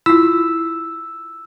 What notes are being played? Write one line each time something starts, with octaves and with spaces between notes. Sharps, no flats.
E4 F4 E6